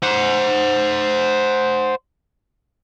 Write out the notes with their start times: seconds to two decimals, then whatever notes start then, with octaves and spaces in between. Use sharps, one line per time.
0.03 C5 F#5